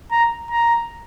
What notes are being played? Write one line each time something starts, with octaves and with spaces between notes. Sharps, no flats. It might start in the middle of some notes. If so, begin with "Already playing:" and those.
A#5
A#5